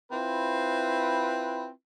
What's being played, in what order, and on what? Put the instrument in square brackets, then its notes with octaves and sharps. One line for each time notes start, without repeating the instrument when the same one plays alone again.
[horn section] C4 E4 F4 B4